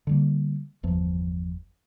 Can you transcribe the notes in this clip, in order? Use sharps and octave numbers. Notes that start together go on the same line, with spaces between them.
D3 G3 A#3
G1 E2 F3